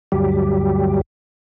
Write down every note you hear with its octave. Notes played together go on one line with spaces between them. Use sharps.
D2 G2 F#3 G3 G4